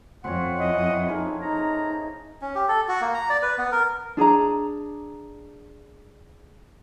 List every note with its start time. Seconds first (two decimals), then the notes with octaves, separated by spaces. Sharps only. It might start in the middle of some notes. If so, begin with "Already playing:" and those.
0.24 F2 C4 C#4 C#5 F#5
0.59 E3 E4 D#5
1.09 A#3 D#4 G#4 A4
1.42 D#4 A#5
2.42 C#4
2.55 G4
2.68 A4
2.88 F#4
3.01 A#3
3.14 A#5
3.30 D5
3.42 B4
3.58 B3
3.72 A#4
4.17 D4 G#4 G#5 A#5